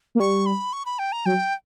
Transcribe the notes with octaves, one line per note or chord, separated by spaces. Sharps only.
A#3
G3 C#6
B5
C#6
B5
G5
A#5
F#3 G5